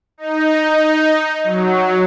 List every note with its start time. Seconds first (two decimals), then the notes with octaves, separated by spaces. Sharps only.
0.18 D#4
1.44 F#3